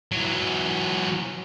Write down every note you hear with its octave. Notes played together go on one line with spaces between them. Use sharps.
E3 F#3